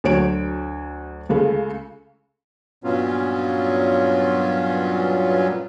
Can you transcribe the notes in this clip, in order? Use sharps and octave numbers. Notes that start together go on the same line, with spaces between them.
D2 F#3 C#5 D7
C#2 C#3 A3
G2 A#2 F#3 B3 C#4 F4